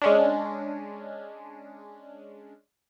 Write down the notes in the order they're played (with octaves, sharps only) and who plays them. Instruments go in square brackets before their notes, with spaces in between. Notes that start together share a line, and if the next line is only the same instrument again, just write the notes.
[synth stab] G#3 C#4 D4